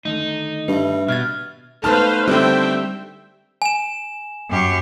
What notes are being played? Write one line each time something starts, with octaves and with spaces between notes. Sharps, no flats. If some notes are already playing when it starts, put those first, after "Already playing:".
D3 D#3 A3 D#4
G2 B4 E5
B2 E5 F6 G#6 A6
A3 B3 D#4 B4 C5 F5 A5 F6
D3 G3 C4 C5 E5 G5
G#5 E7
F#2 G4 C#6